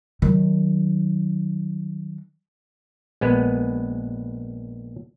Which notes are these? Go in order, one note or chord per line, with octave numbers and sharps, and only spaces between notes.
D#3 F#3
A#1 G#3 B3 B4